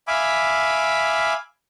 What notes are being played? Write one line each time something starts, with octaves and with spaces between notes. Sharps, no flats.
E5 F5 G#5 B5 D6